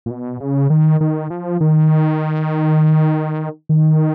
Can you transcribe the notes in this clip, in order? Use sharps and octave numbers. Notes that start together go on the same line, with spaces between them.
A#2
B2
C#3
D#3
D#3
F3
D#3
D#3